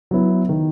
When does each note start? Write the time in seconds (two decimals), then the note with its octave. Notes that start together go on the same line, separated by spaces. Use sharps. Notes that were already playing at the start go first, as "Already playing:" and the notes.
0.11 F#3 B3 E4
0.49 D#3